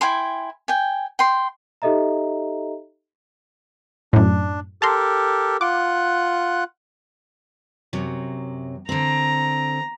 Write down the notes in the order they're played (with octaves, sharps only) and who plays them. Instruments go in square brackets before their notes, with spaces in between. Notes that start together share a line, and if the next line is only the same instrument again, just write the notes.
[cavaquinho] E4 G5 G#5 C6
G5 G#5
G5 C6
[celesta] D#4 G4 A4 D#5 E5 A#5
[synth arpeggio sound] F#2 A2 [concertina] D4
[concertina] G4 A4 A#4 [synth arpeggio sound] A5 A#5 C6
[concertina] F4 F#5 F#6 [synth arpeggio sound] D6
[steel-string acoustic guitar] F#2 C3 F#3
[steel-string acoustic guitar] D3 C4 [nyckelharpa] A#5